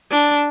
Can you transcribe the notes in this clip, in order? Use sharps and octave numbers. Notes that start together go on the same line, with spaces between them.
D4